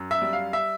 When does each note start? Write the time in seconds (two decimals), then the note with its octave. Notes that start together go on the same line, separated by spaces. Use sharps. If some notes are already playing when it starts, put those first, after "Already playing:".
Already playing: F#2
0.11 E5
0.22 G3
0.33 F5
0.53 E5